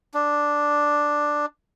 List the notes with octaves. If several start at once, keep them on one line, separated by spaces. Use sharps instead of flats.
D4